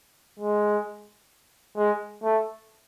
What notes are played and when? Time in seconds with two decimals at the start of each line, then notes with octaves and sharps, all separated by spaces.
0.39 G#3
1.78 G#3
2.24 A3